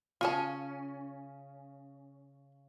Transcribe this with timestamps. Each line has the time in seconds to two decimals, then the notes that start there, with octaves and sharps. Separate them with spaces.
0.21 C#3 C#4 F4 A5